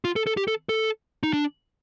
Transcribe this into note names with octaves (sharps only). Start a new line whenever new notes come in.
F4
A4
A4
G4
A4
A4
D#4
D4